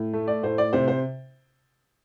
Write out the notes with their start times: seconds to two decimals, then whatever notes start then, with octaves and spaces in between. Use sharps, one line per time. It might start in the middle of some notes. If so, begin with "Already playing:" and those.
Already playing: A2
0.13 A3
0.28 D5
0.43 A2 C5
0.58 D5
0.73 C3 C5
0.88 C5